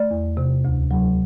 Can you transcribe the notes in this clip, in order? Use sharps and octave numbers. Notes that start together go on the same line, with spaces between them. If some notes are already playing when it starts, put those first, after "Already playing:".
Already playing: A3 D5
E2
C3
D2
F#3